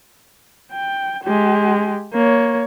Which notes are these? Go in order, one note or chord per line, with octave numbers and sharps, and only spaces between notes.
G5
G#3 G4
A#3 C#5